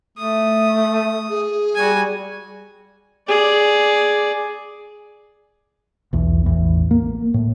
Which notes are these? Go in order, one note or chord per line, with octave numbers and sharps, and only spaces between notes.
A3 D#6
G#4
G3 F#4 G#5
G#4 D5
B1 E2
A1 E2
A#3
A2